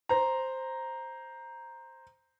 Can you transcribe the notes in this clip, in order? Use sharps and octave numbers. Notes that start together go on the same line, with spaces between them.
C5 A#5